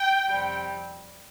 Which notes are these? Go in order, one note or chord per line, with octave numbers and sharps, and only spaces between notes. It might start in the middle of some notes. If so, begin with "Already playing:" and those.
Already playing: G5
F2 C3 G3